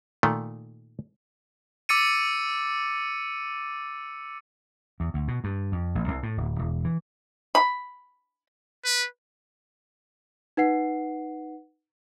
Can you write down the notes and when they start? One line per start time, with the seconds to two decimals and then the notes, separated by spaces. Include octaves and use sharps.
0.23 A#2 D#3 A3
1.89 D6 E6 A6 C#7 D#7
5.00 E2
5.14 D2
5.28 B2
5.44 G2
5.72 F2
5.95 A1
6.08 C2
6.23 A2
6.37 D1
6.59 E1
6.85 E3
7.55 B5
8.85 B4
10.57 D#4 B4 F#5 C7